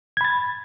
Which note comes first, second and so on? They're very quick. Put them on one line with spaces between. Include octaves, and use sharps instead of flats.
G#6 B5 A6